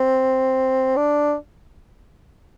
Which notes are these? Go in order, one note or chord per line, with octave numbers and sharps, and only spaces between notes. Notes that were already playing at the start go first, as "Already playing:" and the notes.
Already playing: C4
D4